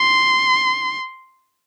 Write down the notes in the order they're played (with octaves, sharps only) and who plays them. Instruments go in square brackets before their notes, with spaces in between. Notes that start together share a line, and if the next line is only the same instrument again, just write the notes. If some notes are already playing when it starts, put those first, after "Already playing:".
Already playing: [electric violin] C6